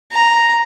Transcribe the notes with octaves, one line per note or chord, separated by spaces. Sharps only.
A#5